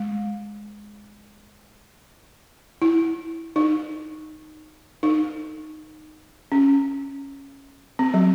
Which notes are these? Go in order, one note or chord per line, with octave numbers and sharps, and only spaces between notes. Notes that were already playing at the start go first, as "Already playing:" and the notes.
Already playing: G#3
E4
D#4
D#4
C#4
C4
F#3